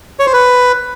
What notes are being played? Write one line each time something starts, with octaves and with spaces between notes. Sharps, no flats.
C#5
C5
B4